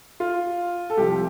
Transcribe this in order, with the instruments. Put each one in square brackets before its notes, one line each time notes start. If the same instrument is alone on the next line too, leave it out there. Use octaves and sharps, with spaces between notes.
[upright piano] F4
A4
C2 C3 F3 G4